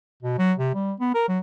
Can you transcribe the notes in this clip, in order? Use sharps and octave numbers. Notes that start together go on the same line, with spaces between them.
B2
F#3
C3
G3
B3
A#4
F#3